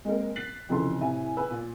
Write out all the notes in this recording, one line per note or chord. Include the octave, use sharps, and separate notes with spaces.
G#3 A#3 C4 A#4
F#6 A6 B6 C7 F#7
F1 C#3 E3 F3 A4 C6
A2 C3 E5 G#5
B4 G#5 E6
A#2